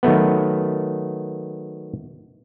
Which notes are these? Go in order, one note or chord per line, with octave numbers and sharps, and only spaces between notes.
D#3 F#3 A3 B3